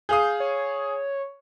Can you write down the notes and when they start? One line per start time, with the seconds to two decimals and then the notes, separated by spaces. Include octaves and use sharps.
0.09 G#4 F5 D#6 G6
0.40 C#5